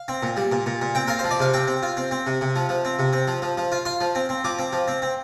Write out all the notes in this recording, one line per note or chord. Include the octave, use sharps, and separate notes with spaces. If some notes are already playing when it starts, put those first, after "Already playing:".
Already playing: F5
C4
A#2
G3
A#2
A#2
A#2
C4 G5
F4 A#4
C5
F3
D5
C3 F5
C4 G5
C4
F4
C4
C4
C3
C3
F3
F3
C4
C3
C4
F3
F3
F3
F4
F4 C6
F3
C4
C4
F3 D6
C4
F3
C4
C4